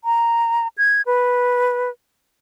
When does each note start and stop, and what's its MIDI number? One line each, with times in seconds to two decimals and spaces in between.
0.04 0.68 82
0.78 1.02 92
1.06 1.90 71